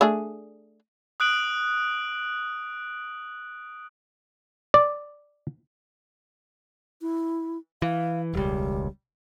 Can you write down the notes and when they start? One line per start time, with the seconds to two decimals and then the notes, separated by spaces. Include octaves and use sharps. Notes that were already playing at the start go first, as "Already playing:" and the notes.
0.01 A3 D4 G#4
1.20 D#6 F#6 D7 F#7
4.74 D5
7.02 E4
7.82 E3 F5
8.34 E1 C#2 G3